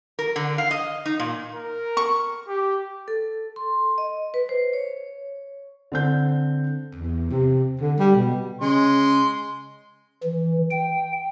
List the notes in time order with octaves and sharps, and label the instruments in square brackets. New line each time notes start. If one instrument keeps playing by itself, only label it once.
[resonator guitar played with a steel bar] A#4
D3
F5
D#5
D#4
A#2
[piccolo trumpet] A#4
[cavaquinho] C#6
[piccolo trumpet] G4
[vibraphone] A4
C6
D#5
B4
C5
C#5
[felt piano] D3 C4 G6
[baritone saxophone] E2
C3
D3
G3
B2
[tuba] C#3 [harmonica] G#3 C6
[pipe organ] E3
G5